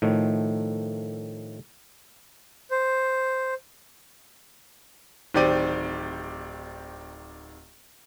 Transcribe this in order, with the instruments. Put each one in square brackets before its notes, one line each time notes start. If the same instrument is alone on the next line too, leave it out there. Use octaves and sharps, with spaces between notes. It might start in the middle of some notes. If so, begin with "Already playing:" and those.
[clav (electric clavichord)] A2 D#3 F3 A3
[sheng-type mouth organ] C5
[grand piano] D1 D#3 C4 G4 D5 D#7